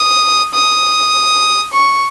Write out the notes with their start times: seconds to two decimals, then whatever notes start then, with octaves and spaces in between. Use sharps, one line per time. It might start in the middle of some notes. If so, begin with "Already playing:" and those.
Already playing: D#6
0.54 D#6
1.72 C#6